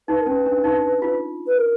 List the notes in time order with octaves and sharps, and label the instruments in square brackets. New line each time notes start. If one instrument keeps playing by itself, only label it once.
[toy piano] D#4 [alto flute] B4
[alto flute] A#4
[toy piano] C#4 [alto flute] B4
[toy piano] D4
D#4
F4
[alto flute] B4
A#4